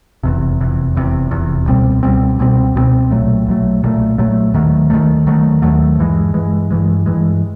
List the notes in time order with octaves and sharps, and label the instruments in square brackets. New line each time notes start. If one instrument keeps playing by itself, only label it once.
[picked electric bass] F1 E2 C3
F1 E2 C3
F1 E2 C3
F1 E2 C3
C#2 B2 G3 C4
C#2 B2 G3 C4
C#2 B2 G3 C4
C#2 B2 G3 C4
B1 A#2 F#3 A3
B1 A#2 F#3 A3
B1 A#2 F#3 A3
B1 A#2 F#3 A3
D#2 D#3 F#3 A3
D#2 D#3 F#3 A3
D#2 D#3 F#3 A3
D#2 D#3 F#3 A3
G2 E3 G#3
G2 E3 G#3
G2 E3 G#3
G2 E3 G#3